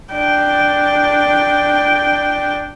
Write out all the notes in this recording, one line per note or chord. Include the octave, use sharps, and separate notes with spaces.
D4 G5